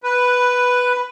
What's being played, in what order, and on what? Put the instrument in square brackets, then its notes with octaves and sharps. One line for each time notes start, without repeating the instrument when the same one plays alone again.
[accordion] B4